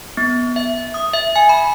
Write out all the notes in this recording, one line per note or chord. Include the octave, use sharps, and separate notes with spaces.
B3
E5
D#6
E5
G#5
B5